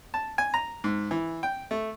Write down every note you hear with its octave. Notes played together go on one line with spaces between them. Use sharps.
A5
G#5
A#5
G#2
E3
G5
A3